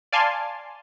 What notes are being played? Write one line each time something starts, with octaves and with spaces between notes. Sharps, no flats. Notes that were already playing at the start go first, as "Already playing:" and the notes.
D5 F5 G#5 A5 C6